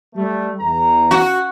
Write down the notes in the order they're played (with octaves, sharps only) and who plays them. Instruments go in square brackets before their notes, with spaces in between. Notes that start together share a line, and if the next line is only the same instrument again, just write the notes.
[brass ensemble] G3 A3
E2 A#5
[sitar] F#4